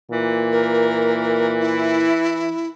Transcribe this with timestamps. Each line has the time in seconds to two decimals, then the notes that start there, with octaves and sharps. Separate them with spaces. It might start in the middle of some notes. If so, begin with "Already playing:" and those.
0.11 A#2 E3
0.52 A#4
1.60 E4